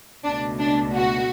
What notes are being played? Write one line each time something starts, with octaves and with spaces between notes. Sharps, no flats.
C#2 B2 A3 D4
D4
F#4